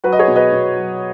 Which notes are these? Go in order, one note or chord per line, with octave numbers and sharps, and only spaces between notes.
F#3 F#4 B4
D#5
G#4 C#5
B2
B4 D#5
B2
F#3